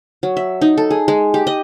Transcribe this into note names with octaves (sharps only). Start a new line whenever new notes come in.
F#3
E5
D#4
A4
G#4
G#3
G4
D#5